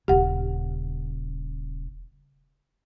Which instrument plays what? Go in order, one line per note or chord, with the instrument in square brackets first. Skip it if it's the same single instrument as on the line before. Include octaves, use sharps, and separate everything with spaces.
[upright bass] D#1 C#3 [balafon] G4 F#5